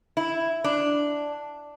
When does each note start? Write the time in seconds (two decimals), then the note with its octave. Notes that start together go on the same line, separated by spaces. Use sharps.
0.17 E4
0.64 D4